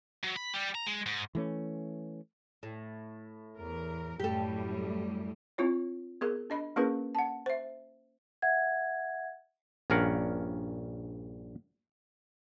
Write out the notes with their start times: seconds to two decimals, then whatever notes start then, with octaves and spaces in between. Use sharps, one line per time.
0.24 F#3
0.36 B5
0.54 G3 G4
0.75 A#5
0.87 G#3
1.06 G#2
1.35 E3 A3 C#4
2.63 A2
3.56 E2 A#4
4.20 F#2 A2 G3 G4 A4
5.58 C4 E4 F4 C#5
6.21 B3 G#4 A#4
6.50 D4 D#5 B5
6.76 A#3 C#4 E4 G#4 A#4 B4
7.15 F#5 A5
7.46 C5 E5
8.42 E5 F#5 G#6
9.90 A#1 G2 C#4 A#4 F5 F#5